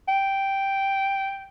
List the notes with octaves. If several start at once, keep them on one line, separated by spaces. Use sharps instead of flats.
G5